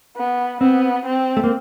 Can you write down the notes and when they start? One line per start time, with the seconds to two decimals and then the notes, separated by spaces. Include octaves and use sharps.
0.17 B3
0.61 B3 C4
1.06 C4
1.37 A3
1.44 A#3